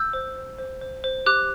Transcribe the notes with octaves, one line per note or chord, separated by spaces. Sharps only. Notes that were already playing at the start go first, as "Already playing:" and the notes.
Already playing: E6 G6
C5
C5
C5
C5
C5
G4 D6 F#6